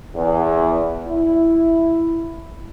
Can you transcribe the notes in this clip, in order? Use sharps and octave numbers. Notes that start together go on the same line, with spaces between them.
E2
E4